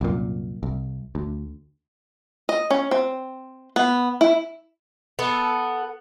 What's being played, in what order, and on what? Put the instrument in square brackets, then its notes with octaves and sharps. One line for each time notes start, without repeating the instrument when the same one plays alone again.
[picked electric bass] C2 F#2 A#2
C2
D2
[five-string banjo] D#5
C#4
C4
B3
E4
[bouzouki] B3 [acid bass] A4